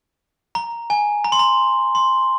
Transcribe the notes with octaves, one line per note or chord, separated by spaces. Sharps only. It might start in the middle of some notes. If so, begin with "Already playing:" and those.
A#5
G#5
A#5
C6
A#5
C6